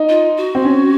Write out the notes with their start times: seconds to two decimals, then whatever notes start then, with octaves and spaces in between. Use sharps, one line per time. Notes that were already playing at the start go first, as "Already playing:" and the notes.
Already playing: D#4
0.09 F4
0.37 F#4
0.55 C4
0.65 C#4